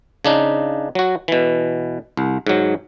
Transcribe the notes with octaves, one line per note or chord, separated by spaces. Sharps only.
C#3 D4 D#4
F#3 F#4
B2 E3
C2
G#2 F#3